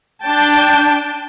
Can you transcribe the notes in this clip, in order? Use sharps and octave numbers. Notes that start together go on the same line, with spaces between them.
D4 G5 A5